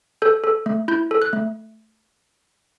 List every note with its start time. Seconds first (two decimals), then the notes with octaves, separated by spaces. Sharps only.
0.22 A4 G6
0.44 A4
0.66 A3
0.88 E4 G6
1.11 A4
1.22 F#6
1.33 A3